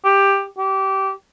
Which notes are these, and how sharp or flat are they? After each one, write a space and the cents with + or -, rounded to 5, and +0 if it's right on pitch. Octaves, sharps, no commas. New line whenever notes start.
G4 +10
G4 -20